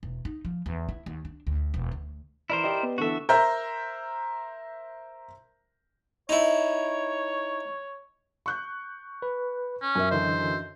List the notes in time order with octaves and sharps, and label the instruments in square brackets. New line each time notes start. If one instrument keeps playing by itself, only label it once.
[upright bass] E1
D#4
F3
E2
E4
D#2
D4
D2
E1
D2
[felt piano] E3 D5 [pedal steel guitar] E4 A#4 C5
[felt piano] G4 D5 D#5 [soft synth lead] B5
[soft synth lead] B3
[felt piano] D3 E3 A4 [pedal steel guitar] F#4 E5
[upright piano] A#4 C5 E5 [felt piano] A#5 G6
[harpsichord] D#4 E4 [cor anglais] C#5
[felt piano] C#6 F#6 G6
[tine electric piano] B4
[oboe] C#4
[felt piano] F#2 A#4 E5 [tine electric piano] G#5
[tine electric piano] D3 E3 D#5 [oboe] C5